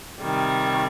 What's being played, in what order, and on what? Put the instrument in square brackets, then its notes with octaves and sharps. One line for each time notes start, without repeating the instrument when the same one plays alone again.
[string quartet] C3 D#3 G3